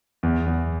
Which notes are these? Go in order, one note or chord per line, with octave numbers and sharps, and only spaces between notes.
E2
E2